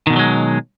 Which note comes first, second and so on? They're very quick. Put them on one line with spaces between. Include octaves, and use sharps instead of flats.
D#3 B2 D3 F#3 G#3